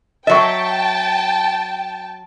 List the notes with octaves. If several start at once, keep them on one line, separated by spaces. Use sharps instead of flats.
F#3 D#5 E5 G5 A5 C#6